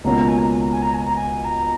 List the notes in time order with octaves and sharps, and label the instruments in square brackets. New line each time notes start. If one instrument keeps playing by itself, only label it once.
[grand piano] C#2 B2 A#3 C#4 [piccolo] A#5
[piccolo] G#5
A#5
G#5
A#5
G#5
A#5
G#5
A#5
G#5
A#5